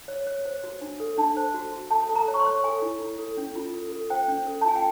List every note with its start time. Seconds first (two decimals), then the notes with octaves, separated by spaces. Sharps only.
0.08 C#5
0.27 C#5
0.45 C5
0.64 F#4
0.81 D4
1.00 A4
1.17 D4 A5
1.37 C5
1.54 F#4
1.72 F#4
1.91 A4 A5
2.09 A4
2.15 A#5
2.28 C#5
2.34 C#6
2.40 C6
2.46 C#5
2.64 A4 G#5
2.82 E4
3.01 E4
3.18 A4
3.37 C#4
3.56 F4
3.74 A4
3.92 A4
4.10 C5 G5
4.28 C#4
4.47 A4
4.61 A5
4.65 F4 G#5
4.76 G5